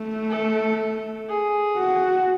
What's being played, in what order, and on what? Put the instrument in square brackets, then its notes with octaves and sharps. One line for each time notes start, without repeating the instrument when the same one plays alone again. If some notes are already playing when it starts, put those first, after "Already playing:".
Already playing: [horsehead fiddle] A3
[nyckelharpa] A4
G#4
[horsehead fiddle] F#4